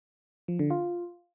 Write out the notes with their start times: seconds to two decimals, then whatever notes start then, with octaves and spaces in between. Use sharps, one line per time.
0.48 F3
0.59 D3
0.70 F4